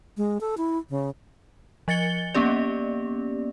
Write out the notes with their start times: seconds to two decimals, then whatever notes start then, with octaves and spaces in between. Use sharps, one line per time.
0.17 G#3
0.40 A4
0.57 E4
0.89 C#3
1.88 F3 D#5 A6 C#7 G7
2.34 A#3 B3 C#4 G4 D5